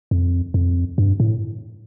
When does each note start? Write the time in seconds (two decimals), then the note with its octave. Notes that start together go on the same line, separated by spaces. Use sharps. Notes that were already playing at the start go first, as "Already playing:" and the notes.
0.11 F2
0.54 F2
0.98 G2
1.20 A2